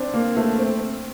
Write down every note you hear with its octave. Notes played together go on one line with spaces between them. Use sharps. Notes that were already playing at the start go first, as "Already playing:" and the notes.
Already playing: C4 D4
A#3
A3
C4